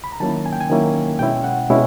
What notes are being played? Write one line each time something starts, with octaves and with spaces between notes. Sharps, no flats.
B5
A#5
D#3 F#3 A#3 C#4 E4 A5
G#5
G5
G#5
D#3 F#3 A#3 C#4 E4
B2 G#3 C#4 E4 G5
F#5
B2 G#3 C#4 E4